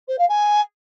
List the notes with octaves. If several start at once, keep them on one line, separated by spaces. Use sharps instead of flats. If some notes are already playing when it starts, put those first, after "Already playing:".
C5
F5
G#5